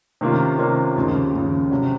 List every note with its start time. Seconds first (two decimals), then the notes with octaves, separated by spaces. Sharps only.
0.21 C3 D#3 A#3 C#4 F4
0.58 C3 D#3 A#3 C#4 F4
0.96 D#2 C#3 F3
1.33 D#2 C#3 F3
1.71 C3 F#3 C#4 F#4